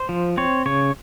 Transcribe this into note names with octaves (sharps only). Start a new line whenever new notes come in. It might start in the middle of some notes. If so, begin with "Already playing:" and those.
Already playing: C5
F3
C4 C#5
C#3 C#5